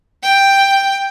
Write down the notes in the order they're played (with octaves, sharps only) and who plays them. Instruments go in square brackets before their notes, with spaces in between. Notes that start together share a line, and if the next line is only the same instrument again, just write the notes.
[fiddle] G5